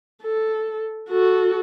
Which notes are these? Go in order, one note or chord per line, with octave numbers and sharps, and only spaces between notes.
A4
F#4 A4